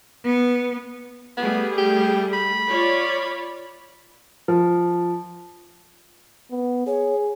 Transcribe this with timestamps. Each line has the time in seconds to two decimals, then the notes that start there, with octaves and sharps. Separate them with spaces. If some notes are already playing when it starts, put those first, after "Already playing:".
0.24 B3
1.37 G3 A3 B3 G#4
1.78 G4
2.33 B5
2.69 F4 C#5 D5
4.48 F3
6.51 B3
6.87 G#4 C#5